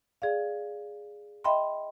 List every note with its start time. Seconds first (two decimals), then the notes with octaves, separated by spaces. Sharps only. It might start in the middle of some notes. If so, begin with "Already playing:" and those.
0.22 G#4 D5 F5
1.44 D#5 E5 G5 B5 C6